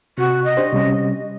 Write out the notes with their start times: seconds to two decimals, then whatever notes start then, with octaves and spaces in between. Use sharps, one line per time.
0.18 C3 F#4
0.44 D#5
0.57 D4 G4 C5
0.72 C3 G3 C#4